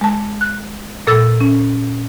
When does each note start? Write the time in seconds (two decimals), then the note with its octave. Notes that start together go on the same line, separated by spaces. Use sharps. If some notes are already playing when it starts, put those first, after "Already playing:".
0.01 G#3 A5
0.41 F#6
1.07 A#2 A4 E6 A6
1.40 C#4